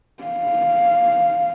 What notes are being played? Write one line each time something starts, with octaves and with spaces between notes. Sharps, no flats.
F5